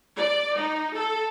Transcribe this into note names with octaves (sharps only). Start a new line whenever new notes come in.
D5
D#4
A4